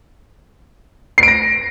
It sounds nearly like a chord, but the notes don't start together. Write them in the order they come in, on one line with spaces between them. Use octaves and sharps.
C7 D7 A#6